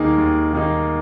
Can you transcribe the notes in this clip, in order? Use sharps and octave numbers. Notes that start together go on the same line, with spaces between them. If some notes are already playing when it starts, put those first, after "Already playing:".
Already playing: D#2 D#3 A#3 D#4 G#4 A#4
D#2
D#3 A#3 D#4